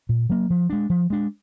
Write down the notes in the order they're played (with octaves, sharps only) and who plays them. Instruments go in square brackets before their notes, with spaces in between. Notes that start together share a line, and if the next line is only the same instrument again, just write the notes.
[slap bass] A#2
F#3 A#3
F3
G#3 D4
F3
G#3 D4